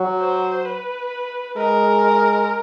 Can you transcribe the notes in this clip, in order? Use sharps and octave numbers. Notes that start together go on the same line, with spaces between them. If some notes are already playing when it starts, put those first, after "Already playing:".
Already playing: F#3
C5
B4
G#3 A#4